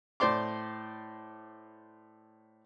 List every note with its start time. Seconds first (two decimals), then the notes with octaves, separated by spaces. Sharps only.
0.20 A2 C5 D5 C6 D6